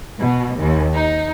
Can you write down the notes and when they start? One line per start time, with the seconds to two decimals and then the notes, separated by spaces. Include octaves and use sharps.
0.19 B2
0.58 D#2
0.95 D#4